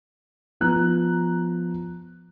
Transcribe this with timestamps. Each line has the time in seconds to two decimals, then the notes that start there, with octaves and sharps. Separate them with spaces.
0.60 F3 B3 A#5 F#6